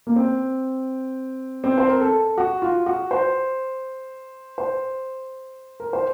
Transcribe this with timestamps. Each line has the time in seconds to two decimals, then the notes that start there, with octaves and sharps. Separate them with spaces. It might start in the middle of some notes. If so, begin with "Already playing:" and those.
0.07 A#3
0.16 C4
1.64 C4
1.78 C5
1.88 A#4
2.01 A4
2.38 F#4
2.62 F4
2.86 F#4
3.11 C5
4.58 C5
5.80 A#4
5.93 C5